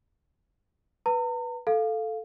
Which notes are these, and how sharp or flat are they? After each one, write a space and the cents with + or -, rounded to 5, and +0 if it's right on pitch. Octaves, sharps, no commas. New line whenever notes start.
B4 -5 A#5 -40
A4 +0 F5 +0